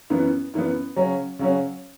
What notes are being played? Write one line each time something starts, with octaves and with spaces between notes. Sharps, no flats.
F#2 E3 B3
F#2 E3 B3
C#3 F#3 C#4
C#3 F#3 C#4